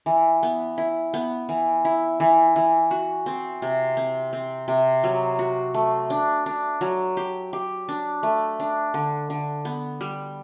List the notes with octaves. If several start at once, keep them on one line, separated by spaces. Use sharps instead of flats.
E3
B3
E4
B3
E3
E4
E3
E3
F#4
C4
C3
C4
C4
C3
F#3
F#4
A3
D4
D4
F#3
G4
G4
D4
A3
D4
D3
D3
B3
G3